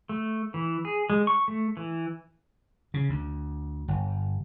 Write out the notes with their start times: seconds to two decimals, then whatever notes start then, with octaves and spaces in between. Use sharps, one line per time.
0.09 A3
0.54 E3
0.85 G#4
1.10 G#3
1.27 C#6
1.48 A3
1.77 E3
2.94 C#3
3.09 D2
3.88 G1